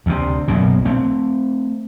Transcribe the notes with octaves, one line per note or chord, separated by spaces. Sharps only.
D2 C3
B1 F#2 A#2
A3 C4